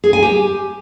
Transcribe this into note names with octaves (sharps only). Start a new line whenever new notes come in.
G#4
G#5
G4